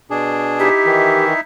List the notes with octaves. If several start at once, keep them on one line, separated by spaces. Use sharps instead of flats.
B2 D4 G#4
D#4 E4 G4 E5
D#3 E3